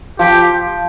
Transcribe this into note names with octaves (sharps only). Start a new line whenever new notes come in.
F3 G4